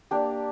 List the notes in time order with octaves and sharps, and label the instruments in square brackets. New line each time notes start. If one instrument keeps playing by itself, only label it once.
[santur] A#3 D4 G4